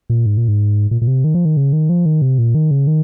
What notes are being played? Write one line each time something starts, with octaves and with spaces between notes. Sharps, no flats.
A#2
G#2
A#2
G#2
A#2
A#2
C3
D#3
F3
D#3
C#3
D#3
F3
D#3
C3
A#2
D#3
C#3
D#3